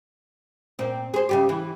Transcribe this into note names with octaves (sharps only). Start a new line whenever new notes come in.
A#2 C4
G#4 C5
C#3 G3 G4
E3